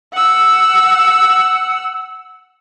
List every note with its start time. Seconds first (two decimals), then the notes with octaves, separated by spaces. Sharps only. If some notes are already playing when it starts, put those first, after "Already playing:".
0.13 F#5 E6